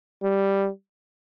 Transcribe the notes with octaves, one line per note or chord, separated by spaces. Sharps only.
G3